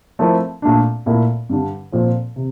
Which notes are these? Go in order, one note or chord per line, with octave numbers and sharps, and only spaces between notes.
F3 A3 C4 E4 A#4
A#2 A3 D4
A#2 A3 E4 A#4
G2 D3 G3 D4
A#2 F3 C4 F4 A4
C3